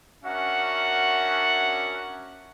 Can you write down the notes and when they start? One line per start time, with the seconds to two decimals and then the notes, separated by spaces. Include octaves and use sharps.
0.24 C#4 D4 F#4 A#4 E5 F#5